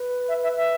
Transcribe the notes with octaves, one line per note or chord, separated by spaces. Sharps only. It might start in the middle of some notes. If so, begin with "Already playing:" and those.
Already playing: B4
E5
E5
E5